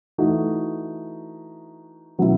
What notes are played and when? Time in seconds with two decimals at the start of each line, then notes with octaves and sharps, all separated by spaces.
0.18 E3 A3 D#4 F#4
2.19 B2 F#3 C#4 E4